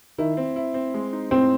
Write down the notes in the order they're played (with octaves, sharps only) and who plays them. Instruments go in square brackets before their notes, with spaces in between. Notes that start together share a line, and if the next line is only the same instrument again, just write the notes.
[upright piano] D#3 [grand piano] E4
[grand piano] C4
E4
C4
G#3
D#4
[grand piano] A2 [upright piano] C4